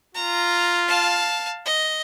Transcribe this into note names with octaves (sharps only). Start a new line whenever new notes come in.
F4 A#5
F5 A5
D#5